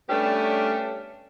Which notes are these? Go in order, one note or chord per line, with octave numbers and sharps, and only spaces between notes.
G3 A3 B3 C#4 D4 G4